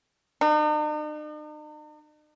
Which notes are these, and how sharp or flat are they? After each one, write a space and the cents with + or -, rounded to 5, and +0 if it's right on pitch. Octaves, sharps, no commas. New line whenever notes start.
D#4 -45